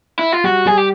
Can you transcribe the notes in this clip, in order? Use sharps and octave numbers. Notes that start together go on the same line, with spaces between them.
E4
F4
G3 F#4
G3 G#4
G4